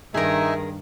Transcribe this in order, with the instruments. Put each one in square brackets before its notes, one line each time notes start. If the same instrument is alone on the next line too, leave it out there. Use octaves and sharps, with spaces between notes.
[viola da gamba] G2 D#3 [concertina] D#4 E5 G#5 [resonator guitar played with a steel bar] G#4 A#4